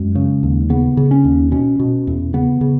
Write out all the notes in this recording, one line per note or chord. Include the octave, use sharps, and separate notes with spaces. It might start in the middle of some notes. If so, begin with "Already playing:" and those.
Already playing: F#2 G#3
C#3
D#2
C#3 B3
C#3
C#4
D#2
B2 C#4
B2
E2
C#3 B3
C#3